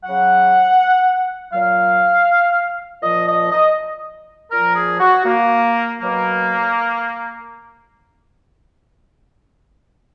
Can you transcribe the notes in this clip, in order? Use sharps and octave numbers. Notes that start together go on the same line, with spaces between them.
C#3 F#3 F#5
A#2 F#3 F5
A#2 F3 D#5
D#5
D#5
A#2 F3 A#4
G#4
F#4
A#3
B2 F#3 A#3